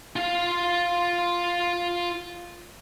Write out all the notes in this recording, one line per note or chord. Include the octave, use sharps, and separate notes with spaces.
F4 F5